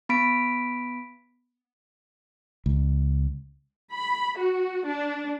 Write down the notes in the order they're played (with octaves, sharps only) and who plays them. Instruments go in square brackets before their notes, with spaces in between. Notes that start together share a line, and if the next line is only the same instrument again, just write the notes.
[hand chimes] B3 B5 B6 D7
[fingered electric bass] C#2
[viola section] B5
F#4
D4